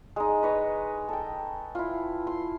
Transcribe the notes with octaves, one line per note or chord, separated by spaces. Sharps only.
G#3 D#4
B4 C#5 D#5
A4 G5
E4 F4
C6